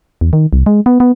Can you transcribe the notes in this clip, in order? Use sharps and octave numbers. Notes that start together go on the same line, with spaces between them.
E2
D#3
C2
G#3
B3
B3